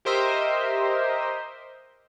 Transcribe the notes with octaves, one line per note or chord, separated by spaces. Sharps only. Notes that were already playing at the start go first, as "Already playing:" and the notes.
G4 A#4 C5 D#5 E5